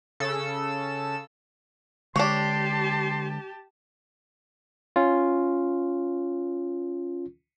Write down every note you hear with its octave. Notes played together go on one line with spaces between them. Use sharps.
C#3 A4 E6
D3 G#3 D4 G4 C#5 A5 C6
C#4 F4